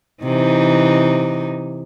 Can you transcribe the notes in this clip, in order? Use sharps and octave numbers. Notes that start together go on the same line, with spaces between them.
C3 E3 D#4